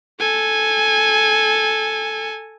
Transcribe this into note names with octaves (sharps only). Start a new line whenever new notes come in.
A4 G#5